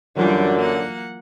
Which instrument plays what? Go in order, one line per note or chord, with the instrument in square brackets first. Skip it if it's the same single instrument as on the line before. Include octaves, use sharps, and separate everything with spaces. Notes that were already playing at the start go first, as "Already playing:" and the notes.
[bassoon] F#2 [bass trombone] D3 [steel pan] E3 F#3 F4 [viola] G3 D4
[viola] A#3 F#5